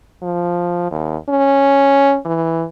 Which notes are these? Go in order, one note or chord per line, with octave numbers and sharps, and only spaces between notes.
F3
D#2
C#4
E3